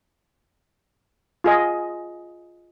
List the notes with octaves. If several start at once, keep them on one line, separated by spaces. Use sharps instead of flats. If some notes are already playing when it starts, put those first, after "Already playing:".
F4 G#4 D#5